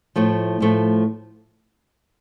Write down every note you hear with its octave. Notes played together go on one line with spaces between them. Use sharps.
A2 F3 A3
A2 F3 A3